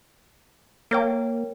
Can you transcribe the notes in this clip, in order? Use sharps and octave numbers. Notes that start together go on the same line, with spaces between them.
A#3 A#4 C#5 G5